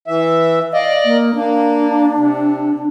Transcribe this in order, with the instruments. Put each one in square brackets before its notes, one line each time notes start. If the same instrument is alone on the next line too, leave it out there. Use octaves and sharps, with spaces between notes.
[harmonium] E3 E5
[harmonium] D5 D#5 [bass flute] F5
[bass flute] A#3
[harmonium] A#3 [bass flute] D4
[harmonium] C3